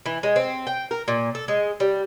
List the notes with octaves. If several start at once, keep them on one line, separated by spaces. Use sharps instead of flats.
E3
G#3
C4
G5
A#4
A#2
A4
G#3
G3